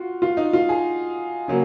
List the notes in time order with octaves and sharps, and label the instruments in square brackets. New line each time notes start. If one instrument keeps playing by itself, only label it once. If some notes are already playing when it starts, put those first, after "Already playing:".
Already playing: [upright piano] F4 F#4
F4
D#4
F4
G#4
C#3 F#3 A#3